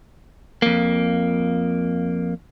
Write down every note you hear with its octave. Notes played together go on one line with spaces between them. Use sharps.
F2 A#3